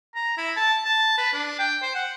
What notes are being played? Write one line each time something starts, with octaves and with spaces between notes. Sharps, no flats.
A#5
E4
A5
A5
B4
D4
G5
C5
F#5